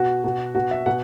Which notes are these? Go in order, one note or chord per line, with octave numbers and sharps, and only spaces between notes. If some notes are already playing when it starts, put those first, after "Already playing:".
Already playing: B2 F#4
B2
B2 F#4
E5
B2 F#5